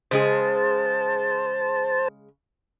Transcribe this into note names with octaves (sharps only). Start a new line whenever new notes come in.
C#3 G#3 G#4 C5 A5